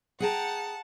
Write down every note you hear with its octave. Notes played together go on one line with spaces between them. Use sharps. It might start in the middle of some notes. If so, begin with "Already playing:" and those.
G#4 F#5 G5 A5 A#5